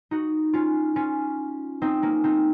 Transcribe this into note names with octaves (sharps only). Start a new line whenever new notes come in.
D#4 F#4
C#4 F4
C#4 F4
C4 D#4
A#3 C#4
C4 D#4